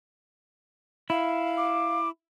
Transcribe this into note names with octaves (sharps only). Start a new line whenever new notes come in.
E4 F5
D6